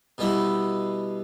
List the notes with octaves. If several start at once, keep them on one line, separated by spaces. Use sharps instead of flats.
B2 G3 B3 E4